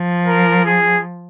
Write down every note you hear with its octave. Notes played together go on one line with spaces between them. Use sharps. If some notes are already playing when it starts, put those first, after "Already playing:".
Already playing: F3
A#4
G#4